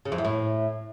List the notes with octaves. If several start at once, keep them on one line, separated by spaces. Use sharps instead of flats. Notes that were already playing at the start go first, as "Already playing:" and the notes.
C#3
F2
E2
A2